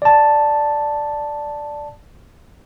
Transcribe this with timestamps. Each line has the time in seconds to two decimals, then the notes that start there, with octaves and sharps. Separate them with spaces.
0.02 D5 A5